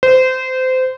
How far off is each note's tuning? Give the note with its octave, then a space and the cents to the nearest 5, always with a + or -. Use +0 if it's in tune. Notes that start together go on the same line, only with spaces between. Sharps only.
C5 -25